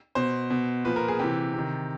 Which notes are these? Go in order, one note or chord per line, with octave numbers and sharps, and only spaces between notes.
B2 C5
B2
A#2 F3 B4
A#4
G#4
C3 E3 G4
C3 D#3